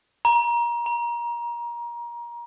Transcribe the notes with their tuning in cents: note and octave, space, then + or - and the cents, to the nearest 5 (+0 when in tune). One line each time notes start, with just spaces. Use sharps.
A#5 +25
A#5 +35